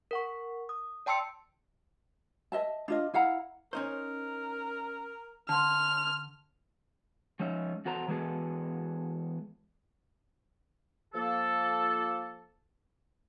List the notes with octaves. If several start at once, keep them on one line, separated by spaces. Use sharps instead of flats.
A#4 F#5 C#6
D#6
D5 G5 A5 C6 E6 C#7
D#5 E5 A5
D4 F4 D#5
E4 F5 F#5 A#5
C#4 D#4 A#4 C5
D3 A5 C6 F6
F3 G#3 C#4 D#4 E5
E2 F#4 A4 C5 A#5
E3 G#3 B3 F#4 G#4 A4
F3 A#3 A4